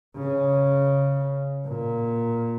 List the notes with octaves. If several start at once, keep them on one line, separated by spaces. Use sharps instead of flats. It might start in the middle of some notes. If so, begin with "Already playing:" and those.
C#3
A#2